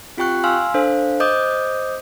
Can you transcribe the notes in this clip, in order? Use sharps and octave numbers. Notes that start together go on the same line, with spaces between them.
C4 F4 G4 G5 C#6 F#6
F5 G#5 C6 E6 F6
D4 A4 C5 F5
C5 D#5 D6 D#6 G6